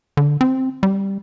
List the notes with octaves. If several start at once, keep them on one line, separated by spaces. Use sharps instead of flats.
D3
C4
G3